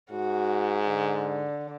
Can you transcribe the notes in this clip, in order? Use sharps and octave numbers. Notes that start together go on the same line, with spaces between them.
G#2 F#4
D3